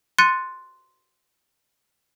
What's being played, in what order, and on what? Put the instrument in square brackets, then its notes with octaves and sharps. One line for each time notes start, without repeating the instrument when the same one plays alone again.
[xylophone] C6 F#6 A6 C#7 D#7